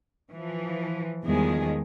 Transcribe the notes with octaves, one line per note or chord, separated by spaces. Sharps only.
E3 F3
E2 D#3 F3 G3 G#3 G#4